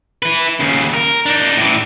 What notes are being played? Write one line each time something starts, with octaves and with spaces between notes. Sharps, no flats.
E4 B4
D#2 C#3
A#4
D4 D#4
A2 E3